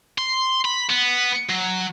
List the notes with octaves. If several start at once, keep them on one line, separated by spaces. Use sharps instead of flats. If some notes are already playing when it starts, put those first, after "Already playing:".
C6
B5
B3
F#3